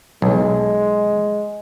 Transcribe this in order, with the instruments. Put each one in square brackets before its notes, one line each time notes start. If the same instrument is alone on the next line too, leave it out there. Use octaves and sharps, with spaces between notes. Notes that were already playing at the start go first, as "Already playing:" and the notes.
[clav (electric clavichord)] B1 [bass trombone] G#3